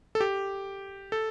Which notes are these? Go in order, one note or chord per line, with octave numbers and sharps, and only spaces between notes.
A4
G4
A4